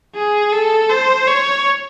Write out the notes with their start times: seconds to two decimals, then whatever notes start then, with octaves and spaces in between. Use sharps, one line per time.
0.16 G#4
0.53 A4
0.90 C5
1.27 C#5